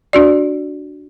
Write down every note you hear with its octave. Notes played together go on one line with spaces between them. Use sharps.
D4 F#4 D5